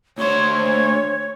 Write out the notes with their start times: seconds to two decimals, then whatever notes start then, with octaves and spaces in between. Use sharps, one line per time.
0.18 D2 C5 C#5